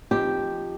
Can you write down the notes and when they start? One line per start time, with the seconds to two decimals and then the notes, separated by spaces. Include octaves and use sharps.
0.11 F3 C4 D#4 G4